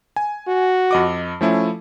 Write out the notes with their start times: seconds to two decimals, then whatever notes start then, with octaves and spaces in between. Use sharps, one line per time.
0.16 G#5
0.47 F#4
0.91 F2 D#5 D6
1.41 F3 A3 C#4 E4